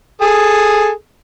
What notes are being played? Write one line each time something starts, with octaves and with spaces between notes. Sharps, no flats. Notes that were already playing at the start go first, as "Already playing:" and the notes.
G#4 A4 D#6